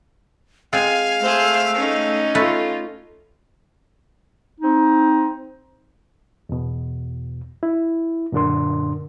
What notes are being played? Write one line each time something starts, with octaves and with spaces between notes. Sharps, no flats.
G#3 C4 F4 F5 G#5
A3 G#4 C5
C#4 D#4
A3 F4 B4
C4 D#4
E2 B2
E4
F#2 A#2 D3 D4 A#4 C6